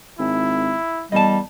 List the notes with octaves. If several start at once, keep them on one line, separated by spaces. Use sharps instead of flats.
G#1 E4
E2 G3 D#5 A5